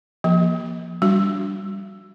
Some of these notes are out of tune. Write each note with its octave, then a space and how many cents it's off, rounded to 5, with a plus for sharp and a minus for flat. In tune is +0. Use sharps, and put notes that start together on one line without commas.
F3 +0 A#3 +25
G3 +0 D4 -20 F#4 -10